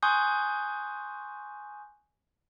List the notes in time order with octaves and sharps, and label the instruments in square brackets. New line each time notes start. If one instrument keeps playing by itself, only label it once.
[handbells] G#5 C6 C#6 D#6 F#6 G6